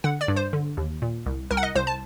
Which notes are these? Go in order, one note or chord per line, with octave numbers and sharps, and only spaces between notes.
D3 F#5
D5
G2
C5
D3
D#2
A#2
C2
C2 A#4
F#5
D#5
C2 C5
A5